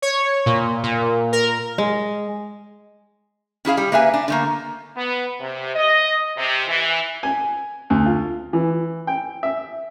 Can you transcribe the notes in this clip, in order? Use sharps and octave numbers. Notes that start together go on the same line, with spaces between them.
C#5
A#2
A#2
A#4
G#3
C#4 E4 G#4 F5
G3
A#3 B4 E5 G#5
D4
D3 A3 A#3
B3
C3
D#5
C3
E3
G#5
D2
F4
E3
G5
E5